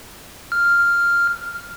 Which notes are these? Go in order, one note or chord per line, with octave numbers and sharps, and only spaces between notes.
F6